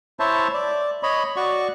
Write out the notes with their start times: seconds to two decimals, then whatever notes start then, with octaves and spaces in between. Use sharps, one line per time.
0.20 E4 C5 C#5 E5 A5
0.54 D5
1.03 C#5 D#5 B5
1.36 F#4 D5 C#6